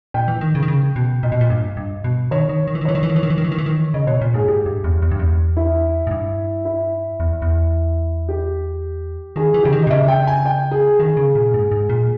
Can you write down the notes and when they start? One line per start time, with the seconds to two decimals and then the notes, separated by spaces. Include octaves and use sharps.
0.14 A#2 G5
0.28 E3
0.41 D#3
0.55 C#3
0.63 D#3
0.68 C#3
0.96 B2
1.23 A#2 D#5
1.32 B2
1.41 A#2
1.50 G2
1.77 G2
2.04 B2
2.31 D#3 C#5
2.49 D#3
2.68 D#3
2.75 E3
2.81 D#3
2.85 E3 C#5
2.95 D#3
3.03 E3
3.10 D#3
3.16 E3
3.23 D#3
3.30 E3
3.38 D#3
3.45 E3
3.52 D#3
3.58 E3
3.66 D#3
3.94 C#3 D#5
4.07 B2 C#5
4.21 A#2
4.34 G#2 G#4
4.48 G#2 G4
4.66 G2
4.84 E2
5.02 E2
5.11 G2
5.19 E2
5.57 E4
6.07 G#2
6.11 G2
6.65 E4
7.20 E2
7.42 E2
8.29 G4
9.36 D#3 G#4
9.54 E3
9.63 C#3 G4
9.73 D#3
9.83 D#5
9.87 B2
9.90 C#3 E5
10.08 G5
10.27 G#5
10.46 G5
10.71 G#4
11.00 D#3 G#4
11.17 C#3
11.35 A#2
11.54 G#2
11.71 G#2
11.89 A#2